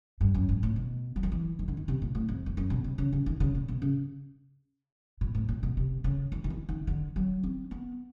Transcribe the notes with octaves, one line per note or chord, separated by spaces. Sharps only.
G2
F#2
G#2
A2
B2
F#3
F3
E3
D#3
D3
D#3
C3
A#2
A2
F2
F2
F#2
B2
C3
C#3
C#3
D#3
C#3
A#2
B2
C#3
A#2
A2
A#2
B2
C3
C#3
E3
D#3
E3
D#3
D3
F#3
C4
B3